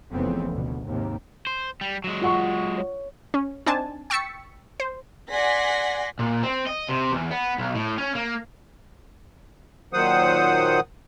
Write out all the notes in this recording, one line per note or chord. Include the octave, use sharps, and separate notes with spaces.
F1 F2 C#3 E3 B3 C4
D2 B2
D#2 G#2 C3
C5
G3
F#3 G#3
F4 F#5 C#6
C#5
C#4
C4 D4 D#4 G#5 A5
G5 C#6 E6 A6 B6 C#7
C5
D5 F#5 G#5 C6 A#6 B6
A#2
C4
D#5
C3
E2
B3
B1
A2
C#4
A#3
A#2 D#3 F#3 C5 F#5 D#6